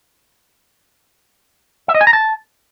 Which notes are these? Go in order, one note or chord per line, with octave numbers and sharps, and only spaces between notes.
E5
D#5
G#5
A#5
A5